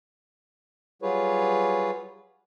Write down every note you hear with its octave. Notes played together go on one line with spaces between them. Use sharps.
F#3 G3 F4 G#4 B4 C#5